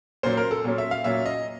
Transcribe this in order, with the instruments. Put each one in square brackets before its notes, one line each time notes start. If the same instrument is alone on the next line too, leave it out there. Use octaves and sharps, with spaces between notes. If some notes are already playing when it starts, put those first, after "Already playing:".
[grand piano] A#2 F#3 A#3 C#4 C5
A#4
A4
A#2 F#3 A#3 C#4
E5
F5
A#2 F#3 A#3 C#4 E5
D#5